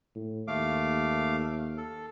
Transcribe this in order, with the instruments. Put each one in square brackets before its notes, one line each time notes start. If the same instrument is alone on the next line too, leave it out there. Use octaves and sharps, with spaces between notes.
[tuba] A2
[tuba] D#2 [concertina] A3 F5 D6
[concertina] A4